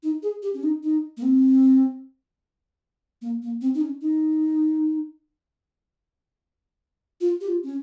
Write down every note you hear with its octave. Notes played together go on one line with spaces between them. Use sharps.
D#4
G#4
G4
C#4
D#4
D#4
A#3
C4
A#3
A#3
C4
D#4
C#4
D#4
F4
G4
F4
C#4